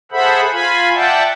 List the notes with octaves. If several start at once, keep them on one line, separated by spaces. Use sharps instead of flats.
G#4 A4 C5 E5 F#5 B5
F4 F5 G#5 B5
D5 E5 F#5 G5 A5